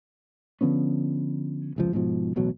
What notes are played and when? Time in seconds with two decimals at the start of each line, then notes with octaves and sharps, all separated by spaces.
0.61 D3 F3 B3 C#4
1.76 F1 C#2 F3
1.93 G#2 B2 F3
2.36 D1 A1 B2 F#3